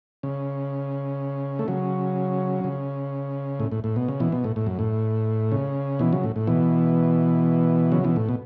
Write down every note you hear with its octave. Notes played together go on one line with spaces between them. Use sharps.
C#3
A3
C#3 F#3
C#3
A2
A2
A2
B2
C#3
B2 E3
B2
A2
A2
F#2
A2
C#3
B2 E3
C#3 F#3
A2
A2
B2 E3
C#3 F#3
B2 E3
A2
B2